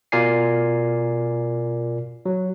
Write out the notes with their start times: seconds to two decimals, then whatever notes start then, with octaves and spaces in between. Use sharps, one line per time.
0.12 B2 F4 A#4 D5 G#5 C7
2.26 F#3